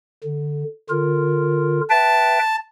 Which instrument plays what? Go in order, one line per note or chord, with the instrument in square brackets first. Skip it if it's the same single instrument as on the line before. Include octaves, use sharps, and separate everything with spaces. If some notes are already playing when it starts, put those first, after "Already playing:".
[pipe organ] D3
D3 F4 A#4
[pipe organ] B4 E5 G5 [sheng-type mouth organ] A5